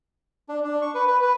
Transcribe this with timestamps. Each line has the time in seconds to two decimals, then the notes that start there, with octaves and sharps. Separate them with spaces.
0.49 D4
0.64 D4
0.82 C#6
0.94 B4
1.07 B4
1.22 B4